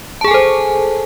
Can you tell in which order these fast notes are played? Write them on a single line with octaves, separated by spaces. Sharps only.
A5 G#4 G#5 A4 C5